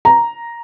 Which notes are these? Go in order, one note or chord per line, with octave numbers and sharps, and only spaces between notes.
A#5